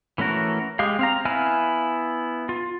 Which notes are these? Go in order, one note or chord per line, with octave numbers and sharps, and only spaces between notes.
E3 A3 C#4 F#4 A#4
G#3 G4 F5
C4 F5 A#5
B3 E4 F5 G#5 F6
F4